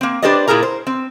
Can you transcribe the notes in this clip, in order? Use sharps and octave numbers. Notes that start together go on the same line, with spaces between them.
A#3 C4
D4 G4 B4 C5 D5 D#5
A#2 E4 G#4 A#4 A#5
C5
C4